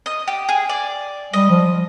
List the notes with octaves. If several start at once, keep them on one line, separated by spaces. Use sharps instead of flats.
D#5
G4
G#4
D5
G3 D#5
F3